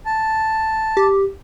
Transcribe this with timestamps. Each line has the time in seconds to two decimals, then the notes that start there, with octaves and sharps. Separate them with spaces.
0.06 A5
0.97 G4